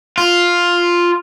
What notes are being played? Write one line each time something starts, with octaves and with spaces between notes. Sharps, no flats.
F4